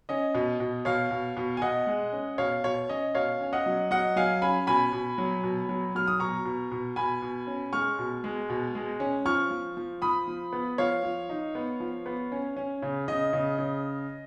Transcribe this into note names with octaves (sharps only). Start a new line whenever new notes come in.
C#4 D#5
B2
B2
B2 C#5 F5
B2
B2
G#5
B2 D#5 F#5
G#3
C#4
B2 C#5 F5
B2 C#5
C#4 D#5
B2 C#5 F5
C#4
D#5 F#5
F#3
F#3 D#5 F#5
F#3 F5 G#5
C#4 G#5 B5
B2 G#5 B5
B2
F#3
B2
F#3
F#3 F6
D#6
B2 A#5 C#6
B2
B2
B2 G#5 B5
B2
C#4
G#3 C#6 F6
B2
G#3
B2
G#3
C#4
F3 C#6 F6
F3
F3
F3 B5 D#6
F3
B3
F3 C#5 F5
F3
D#4
B3
F3
B3
C#4
C#4
C#3
C#3 D#5
C#3
C#3